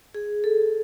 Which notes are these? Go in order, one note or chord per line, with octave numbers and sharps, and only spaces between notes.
G#4
A4